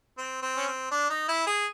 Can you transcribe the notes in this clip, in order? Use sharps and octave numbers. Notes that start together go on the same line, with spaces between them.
C4
C4
C#4
C4
D4
D#4
E4
G#4